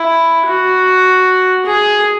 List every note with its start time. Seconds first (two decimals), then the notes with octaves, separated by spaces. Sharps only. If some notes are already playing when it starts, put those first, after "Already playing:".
Already playing: E4
0.46 F#4
1.66 G#4